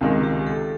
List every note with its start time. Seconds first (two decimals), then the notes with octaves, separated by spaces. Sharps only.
0.01 C#2 C3 D#3 G#3
0.23 G4
0.47 A4